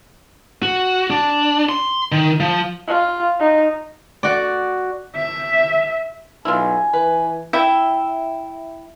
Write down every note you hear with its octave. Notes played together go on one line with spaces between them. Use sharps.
F#4
D4
C6
D#3
F3
F4
D#4
F#4 D5
E5
B1 E4 F4 G#5
E3 B4
E4 E5 G5